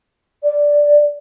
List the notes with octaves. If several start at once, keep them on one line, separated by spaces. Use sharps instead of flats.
D5